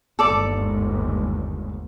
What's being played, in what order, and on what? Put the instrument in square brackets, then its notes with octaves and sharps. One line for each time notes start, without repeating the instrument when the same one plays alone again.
[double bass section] G1 D#2 G#2 [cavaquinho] A4 D5 D6